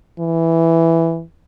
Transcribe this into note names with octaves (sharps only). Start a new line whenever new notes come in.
E3